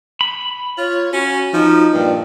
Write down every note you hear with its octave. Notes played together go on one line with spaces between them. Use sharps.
B5
F4 C#5
C#4 F#4
F3 D#4
G2 A#2 D5